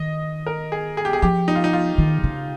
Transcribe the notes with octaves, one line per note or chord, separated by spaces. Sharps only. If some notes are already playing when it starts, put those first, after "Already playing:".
Already playing: D#3 D#5
A#4
G#4
G#4
G4
G#4
F3 G4
D#4
F4
D#4
F4
D#3
C#3